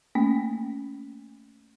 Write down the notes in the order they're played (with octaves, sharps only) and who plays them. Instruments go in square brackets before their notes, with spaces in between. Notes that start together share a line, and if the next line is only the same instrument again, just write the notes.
[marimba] A3 A#3 C#4